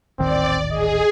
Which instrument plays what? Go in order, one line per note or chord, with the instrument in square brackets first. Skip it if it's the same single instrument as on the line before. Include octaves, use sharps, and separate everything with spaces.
[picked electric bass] D#1 A1 D#3 [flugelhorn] C4 [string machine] D5
[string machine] G#4 [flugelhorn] D#5